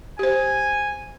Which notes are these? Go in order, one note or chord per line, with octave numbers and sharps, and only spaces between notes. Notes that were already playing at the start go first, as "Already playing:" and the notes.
G4 C5 G#5